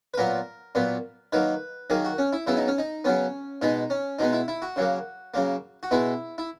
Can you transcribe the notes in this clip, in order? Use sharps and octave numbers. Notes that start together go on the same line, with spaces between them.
B4
A#2 F#3 B3 A#4
A#2 F#3 B3
D#3 F#3 A#3 B4
D#3 F#3 A#3 G#4
F#4
C#4
E4
C#3 F#3 B3 E4
D#4
C#4
D#4
C#3 F#3 B3 C#4
B2 G#3 B3 D#4
C#4
B2 G#3 B3 D#4
E4
E4
F#4
C#3 F#3 A#3
C#3 F#3 A#3
F#4
B2 G#3 B3 E4
E4